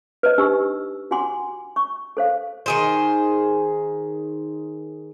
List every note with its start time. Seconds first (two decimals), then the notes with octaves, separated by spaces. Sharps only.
0.23 B4 C5 D#5
0.38 D4 D#4 G4 C#6 E6
1.11 F4 F#4 F#5 G#5 C6 D6
1.76 C#6
2.17 A4 C5 F5
2.66 D#3 G#4 C5